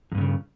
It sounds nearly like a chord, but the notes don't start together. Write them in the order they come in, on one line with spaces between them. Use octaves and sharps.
E2 G2 A#2 C#3